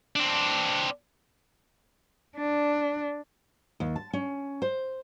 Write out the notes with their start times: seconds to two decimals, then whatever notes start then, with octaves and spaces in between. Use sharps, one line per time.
0.16 C4 D4
2.37 D4
3.80 D#2
3.96 A5
4.13 C#4
4.62 C5